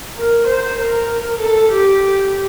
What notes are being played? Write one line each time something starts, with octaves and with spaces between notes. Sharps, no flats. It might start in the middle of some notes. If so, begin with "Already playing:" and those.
A#4
C5
A#4
A4
G4